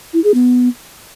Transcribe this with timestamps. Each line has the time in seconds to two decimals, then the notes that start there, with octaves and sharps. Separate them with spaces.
0.13 E4
0.24 G#4
0.34 B3